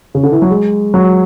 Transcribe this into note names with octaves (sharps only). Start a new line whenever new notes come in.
C#3
D3
E3
F#3
G#3
F#3